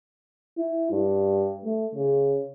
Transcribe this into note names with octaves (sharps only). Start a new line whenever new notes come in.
E4
G2
A3
C#3